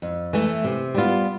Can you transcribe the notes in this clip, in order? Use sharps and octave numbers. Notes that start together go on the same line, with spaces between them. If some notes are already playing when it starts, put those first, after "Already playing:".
F2
E3 A3
C3
G3 B3 F4